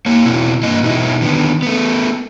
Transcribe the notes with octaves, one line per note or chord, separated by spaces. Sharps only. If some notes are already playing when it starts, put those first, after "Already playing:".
A#3 C#5
B2 C4 E4
G2 A#3 D#5
B2 D#4 E4
D3 D#3 B3
A3 B3